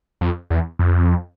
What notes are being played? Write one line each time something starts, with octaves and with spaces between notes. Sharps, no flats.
F2
E2
F2